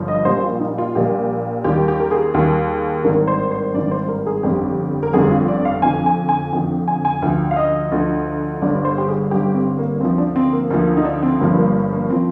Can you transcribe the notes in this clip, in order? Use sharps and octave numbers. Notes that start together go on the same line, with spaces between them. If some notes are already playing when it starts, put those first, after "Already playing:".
Already playing: G1 G2 F3
D#5
A#1 A#2 G3 C5
F4
D#4
F4
A#1 A#2 G3 G4
D#2 D#3 G3 G4
G4
A#4
G#4
D#2 D#3 G3
G#1 G2 D#3 A#4
C5
C5
G#1 G2 D#3 D5
C5
A#4
G#4
G1 F2 D3 G3 G4
A#4
G1 F2 D3 G3 G#4
F4
D5
F5
F2 D3 F3 G#5
G#5
G#5
F2 D3 F3 G5
G#5
G#5
D2 D3 F3 G5
F5
D#5
D2 D3 F3
G1 G2 D3 D5
C5
G4
G#4
G1 G2 D3 G4
C4
A#3
D2 D3 F3 C4
D4
C4
A#3
D2 D3 F3 A#3
D#4
D4
C4
G1 G2 F3 A#3
A#3
A#3
F3 C4